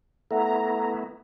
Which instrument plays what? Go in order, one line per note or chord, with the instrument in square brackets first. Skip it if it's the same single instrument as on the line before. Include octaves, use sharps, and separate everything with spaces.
[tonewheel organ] A3 B3 E4 [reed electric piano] A4 E5 F#5 [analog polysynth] A#5